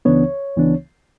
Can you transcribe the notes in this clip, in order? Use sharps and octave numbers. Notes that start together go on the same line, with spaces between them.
C#2 C#3 E3 B3 D4 C#5
C#2 C#3 E3 B3 D4